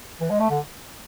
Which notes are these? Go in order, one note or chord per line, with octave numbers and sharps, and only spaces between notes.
E3
G#3
A3
D3